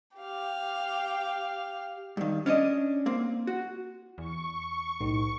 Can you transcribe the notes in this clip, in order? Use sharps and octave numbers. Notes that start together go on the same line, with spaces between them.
G4 F5
G2 D#3
C#4 D4 E4 D#5
A#3 C4
F#4
E2 C#6
B1 A2 D#4